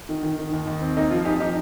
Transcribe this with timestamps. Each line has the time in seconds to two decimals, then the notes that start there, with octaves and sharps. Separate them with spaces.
0.09 D#3
0.23 D#3
0.38 D#3
0.53 D#2
0.66 D#2
0.81 C4
0.97 A#3 D#4
1.10 F3 F4
1.25 F2 D#4 G4
1.40 F3 D#4 G4